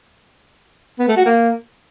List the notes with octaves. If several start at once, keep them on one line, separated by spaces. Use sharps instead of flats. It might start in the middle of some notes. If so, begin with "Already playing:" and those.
B3
A3
F#4
A#3